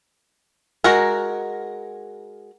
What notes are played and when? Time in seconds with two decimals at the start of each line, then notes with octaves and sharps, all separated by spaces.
0.84 G#3 F#4 A#4